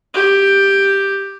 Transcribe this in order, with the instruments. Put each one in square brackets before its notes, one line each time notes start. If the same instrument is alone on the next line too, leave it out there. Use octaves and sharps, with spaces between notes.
[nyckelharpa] G4